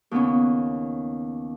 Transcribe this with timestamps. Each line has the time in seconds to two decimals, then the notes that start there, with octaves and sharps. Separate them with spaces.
0.11 D#2 C#3 B3 C#4